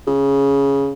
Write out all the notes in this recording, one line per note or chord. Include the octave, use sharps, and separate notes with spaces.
C#3